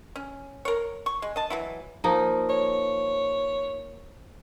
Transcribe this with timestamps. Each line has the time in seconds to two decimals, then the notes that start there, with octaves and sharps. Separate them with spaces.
0.16 C#4
0.65 A#4 C#5
1.06 C#6
1.22 G#3
1.36 D#5 A5
1.50 E3 F#3 E4
2.04 F3 A#3 D#4
2.49 C#5